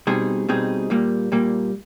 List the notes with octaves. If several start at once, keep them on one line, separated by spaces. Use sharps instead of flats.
B2 G3 C4 D#4 G#4
B2 G3 C4 D#4 G#4
A#2 G3 A#3
A#2 G3 A#3